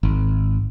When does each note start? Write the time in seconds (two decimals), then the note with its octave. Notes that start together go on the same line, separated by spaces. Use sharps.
0.03 G#1